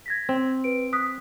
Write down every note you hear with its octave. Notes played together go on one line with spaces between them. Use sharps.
G#6 A#6 B6
C4
B4 D7
D#6 F#6 B6